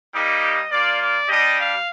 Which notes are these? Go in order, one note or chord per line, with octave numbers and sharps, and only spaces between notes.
G3 A#3 D#4 G4 D#5
A#3 F4 D5
D5
G3 D4 G4 D#5
F5